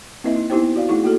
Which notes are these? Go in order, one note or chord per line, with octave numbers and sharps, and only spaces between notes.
A#3 C4 E4 B4 D#5 E5
D#4
B3 D#4 E4 G4 C5 G5
F#4 D5 F5
A3 D#4 E4 G#4 C#6
A#3 F#4 A4